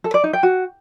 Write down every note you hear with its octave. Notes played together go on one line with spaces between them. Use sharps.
A4
D5
D#4
G5
F#4